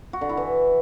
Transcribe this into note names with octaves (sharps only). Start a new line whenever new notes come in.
F#4
D3
E4
E3